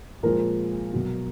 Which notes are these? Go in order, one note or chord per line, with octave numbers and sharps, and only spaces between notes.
A#2 F3 G#3 A#4
B2 F#3